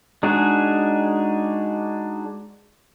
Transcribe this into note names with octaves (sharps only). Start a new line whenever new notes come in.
G#3 D4 D#4 F#4 G#4